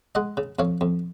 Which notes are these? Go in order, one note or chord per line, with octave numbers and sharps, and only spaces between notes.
G#3 D#5 F#5
C#3
F2 C#5 F5
F2